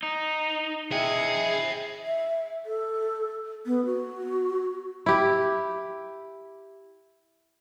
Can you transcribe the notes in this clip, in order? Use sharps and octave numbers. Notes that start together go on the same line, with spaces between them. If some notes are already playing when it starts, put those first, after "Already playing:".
D#4
E4 G#4 D#5 E5 G5
E5
A4
B3
F#4
E4 G4